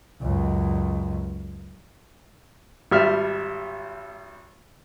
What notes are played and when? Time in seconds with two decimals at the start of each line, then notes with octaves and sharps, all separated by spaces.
0.21 C#2 F#2
2.91 G#1 G3 E5 F6